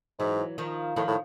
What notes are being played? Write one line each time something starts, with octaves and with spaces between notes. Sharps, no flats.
G#2 E3 F#3
D#3 F3
A2 D#3 F3
A2